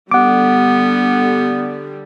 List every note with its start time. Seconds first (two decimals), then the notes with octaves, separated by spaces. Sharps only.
0.11 D3 G3 B3 F#5 D6